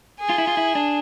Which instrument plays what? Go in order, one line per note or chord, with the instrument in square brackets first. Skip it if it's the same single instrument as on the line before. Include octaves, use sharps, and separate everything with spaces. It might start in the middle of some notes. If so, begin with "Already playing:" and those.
[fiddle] G#4
[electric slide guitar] F4
E4
F4
E4
D4